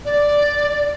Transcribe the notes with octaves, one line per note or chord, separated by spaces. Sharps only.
D5